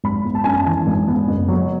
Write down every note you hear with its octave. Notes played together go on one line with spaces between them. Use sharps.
G#1 B5
B3
A5
F#2 G#5
A5
E3 G#5
G#1
B3
F#1
F#3